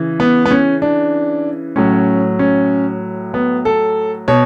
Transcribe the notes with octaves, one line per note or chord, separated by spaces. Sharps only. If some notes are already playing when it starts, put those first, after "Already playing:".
Already playing: C#3 E3
B3
B3
C#4
D4
A2 F#3 C#4
C#4
B3
A4
B2 C#5